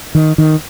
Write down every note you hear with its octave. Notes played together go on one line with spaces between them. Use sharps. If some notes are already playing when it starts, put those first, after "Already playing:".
D#3
D#3